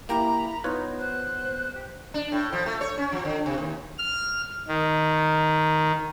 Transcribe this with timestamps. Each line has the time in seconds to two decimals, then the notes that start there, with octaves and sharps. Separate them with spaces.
0.09 A#3 E4 G4 A#5 B5
0.64 B3 D#4 F4 B4 C#5
0.99 C5 F#6
1.74 G4
2.14 D4
2.32 A2
2.53 F3
2.66 A3
2.81 C#5
2.98 C#4
3.12 F3
3.25 D3
3.46 C3
3.58 D#2
3.98 F6
4.68 D#3